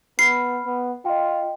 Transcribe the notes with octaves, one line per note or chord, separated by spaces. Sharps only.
B3 B5 F6 C7
B3
F4 D#5 G5